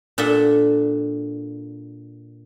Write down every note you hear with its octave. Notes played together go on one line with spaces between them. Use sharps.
A#2 D4 A4 E5 F#5